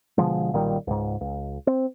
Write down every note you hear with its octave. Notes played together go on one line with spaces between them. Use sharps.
B2 D3 F3 G#3
B1 A#2 D#3 G3
C#2 G#2
C#2
C4